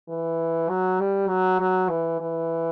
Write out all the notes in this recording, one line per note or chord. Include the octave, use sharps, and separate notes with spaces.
E3
F#3
G3
F#3
F#3
E3
E3